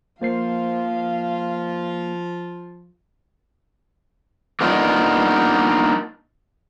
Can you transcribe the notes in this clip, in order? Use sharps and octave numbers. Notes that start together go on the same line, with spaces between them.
F3 A#3 F4 C5 F5 C7
A#3 B3 D4 D#4 F4